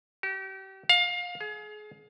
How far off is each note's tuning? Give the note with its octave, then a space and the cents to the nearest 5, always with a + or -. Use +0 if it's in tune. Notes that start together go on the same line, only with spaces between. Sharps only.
G4 -35
F5 +25
G#4 +30